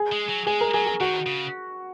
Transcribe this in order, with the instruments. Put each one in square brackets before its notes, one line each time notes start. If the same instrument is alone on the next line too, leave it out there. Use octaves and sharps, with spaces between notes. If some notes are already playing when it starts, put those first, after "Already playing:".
Already playing: [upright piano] G#4
[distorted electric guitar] G#3
F#3
[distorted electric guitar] G#3 [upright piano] G#4
[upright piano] A#4
[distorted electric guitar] F#3 [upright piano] G#4
[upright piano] G#4
[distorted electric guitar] D#3 [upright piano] F#4
[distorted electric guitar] C#3